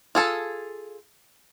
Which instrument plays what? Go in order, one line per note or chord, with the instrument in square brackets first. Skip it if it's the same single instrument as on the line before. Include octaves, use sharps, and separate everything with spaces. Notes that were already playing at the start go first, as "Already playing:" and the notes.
[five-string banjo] F4 G#4 A4